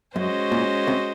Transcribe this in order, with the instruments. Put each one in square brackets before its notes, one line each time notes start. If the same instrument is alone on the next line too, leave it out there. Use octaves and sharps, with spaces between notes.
[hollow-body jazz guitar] F#2 [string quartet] G#3 C#4 F#4 C5 D#5
[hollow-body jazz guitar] A#2
C2 C3